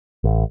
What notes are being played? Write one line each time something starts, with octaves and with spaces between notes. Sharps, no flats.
A1